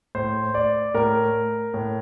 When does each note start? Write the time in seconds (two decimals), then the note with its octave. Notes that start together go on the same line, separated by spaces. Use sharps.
0.15 A2 C5
0.54 D5
0.95 A2 A#4
1.74 A2